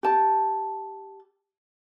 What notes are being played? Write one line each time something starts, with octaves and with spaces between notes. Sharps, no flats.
G4 A5